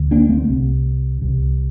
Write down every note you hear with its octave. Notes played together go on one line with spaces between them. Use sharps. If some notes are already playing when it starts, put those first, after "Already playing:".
Already playing: D2 D3
A#3 D4
A3 C4
C2 C3
C2 C3